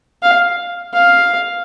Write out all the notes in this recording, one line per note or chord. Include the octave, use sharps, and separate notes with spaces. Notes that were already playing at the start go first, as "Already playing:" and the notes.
F5
F5